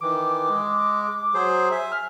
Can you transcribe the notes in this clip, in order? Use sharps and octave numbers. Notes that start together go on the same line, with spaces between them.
D#3 E3 D6
G#3
F#3 G#4 C5
E5 G#5
F6